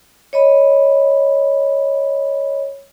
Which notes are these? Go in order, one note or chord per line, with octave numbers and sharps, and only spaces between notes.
C#5 D#5 B5